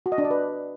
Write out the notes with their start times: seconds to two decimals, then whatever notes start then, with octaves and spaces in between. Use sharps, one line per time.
0.06 F#4
0.12 D#5
0.18 D4
0.24 D5
0.30 B4